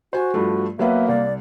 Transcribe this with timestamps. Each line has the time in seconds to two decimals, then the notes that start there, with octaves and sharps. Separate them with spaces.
0.13 F#4 C5 G#5
0.34 G2 F3 A3
0.79 F#3 A#3 B3 B4 E5
1.08 C2 D5